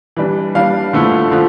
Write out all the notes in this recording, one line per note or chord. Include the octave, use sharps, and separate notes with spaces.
E3 G3 D4
E3 G3 D4 F5
D3 F3 A3 E4
D3 F3